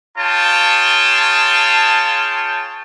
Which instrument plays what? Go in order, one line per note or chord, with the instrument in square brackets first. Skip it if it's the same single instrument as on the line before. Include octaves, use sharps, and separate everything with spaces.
[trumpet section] F4 G#4 C#5 G5 A5